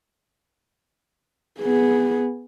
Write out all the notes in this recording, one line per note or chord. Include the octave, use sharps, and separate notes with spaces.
B3 G#4